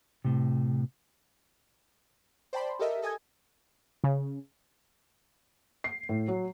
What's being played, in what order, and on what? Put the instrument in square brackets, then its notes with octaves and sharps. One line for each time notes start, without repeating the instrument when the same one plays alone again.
[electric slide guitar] A2 C3
[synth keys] C5 D5 G5 A5 B5 C6
G4 A4 A#4 D#5 E5
A4 D#5 G#5 D#6 G#6
[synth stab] C#3
[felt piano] C7
A2
F#3